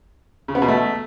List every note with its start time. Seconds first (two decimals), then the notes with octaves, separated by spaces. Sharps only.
0.48 C#3
0.55 B3
0.62 B2
0.68 A3